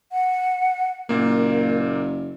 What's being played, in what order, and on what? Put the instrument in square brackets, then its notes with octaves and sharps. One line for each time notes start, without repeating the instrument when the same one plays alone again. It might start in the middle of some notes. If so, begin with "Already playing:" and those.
[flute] F#5
[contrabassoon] F#1 [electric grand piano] A#2 A#3 [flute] A#4